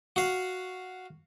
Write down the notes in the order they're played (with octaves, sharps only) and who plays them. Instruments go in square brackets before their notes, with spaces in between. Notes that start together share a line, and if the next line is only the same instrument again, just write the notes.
[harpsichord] F#4 F5